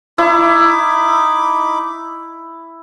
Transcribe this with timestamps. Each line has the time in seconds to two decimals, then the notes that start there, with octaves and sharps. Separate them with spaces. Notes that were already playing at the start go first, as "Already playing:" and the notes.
0.18 D#4 E4 B5 D6